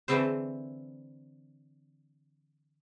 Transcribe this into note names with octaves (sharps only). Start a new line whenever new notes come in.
D3 E3 A3 C4 E4 C5